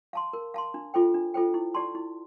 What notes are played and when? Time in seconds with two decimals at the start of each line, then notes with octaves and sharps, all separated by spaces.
0.13 F5 A5 C6
0.33 A#4
0.54 F5 A5 C6
0.74 D4
0.94 F4 A4 C5 G5
1.14 D4
1.34 F4 A4 C5 G5
1.54 E4
1.74 G4 D5 A5 C6
1.95 E4